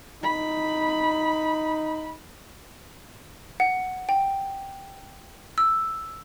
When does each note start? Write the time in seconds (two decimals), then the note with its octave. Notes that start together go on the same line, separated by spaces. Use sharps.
0.23 D#4 B5
3.60 F#5
4.09 G5
5.58 E6